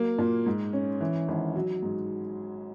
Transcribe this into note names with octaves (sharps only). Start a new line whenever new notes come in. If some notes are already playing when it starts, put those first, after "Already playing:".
Already playing: F#3 A#3
A#2
G#2
C#4
E3
G#1
F#3
G#2